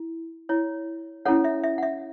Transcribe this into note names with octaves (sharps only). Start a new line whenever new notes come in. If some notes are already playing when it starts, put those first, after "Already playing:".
Already playing: E4
E4 C#5
C#4 E4 A4 C#5 F#5
E5
E5
F#5
E5